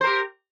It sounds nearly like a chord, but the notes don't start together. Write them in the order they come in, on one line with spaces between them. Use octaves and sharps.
C5 A#4 G4